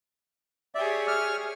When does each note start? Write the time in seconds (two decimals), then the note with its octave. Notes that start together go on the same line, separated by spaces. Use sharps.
0.75 G4 G#4 C#5 D5 E5
1.08 F6